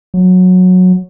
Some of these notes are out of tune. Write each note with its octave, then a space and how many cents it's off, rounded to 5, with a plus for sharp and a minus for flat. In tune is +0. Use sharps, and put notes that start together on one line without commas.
F#3 -15